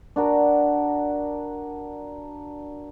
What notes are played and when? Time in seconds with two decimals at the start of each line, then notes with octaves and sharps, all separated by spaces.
0.16 D4 F#4 A#4